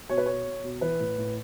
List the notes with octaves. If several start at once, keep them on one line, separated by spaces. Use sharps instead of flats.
B2 C#5
B4
B2 C#5
B2
B2
E3 B4
A2
A2